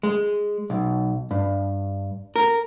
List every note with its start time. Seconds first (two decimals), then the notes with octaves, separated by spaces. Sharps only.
0.03 G#3
0.70 B1
1.31 G2
2.36 A#4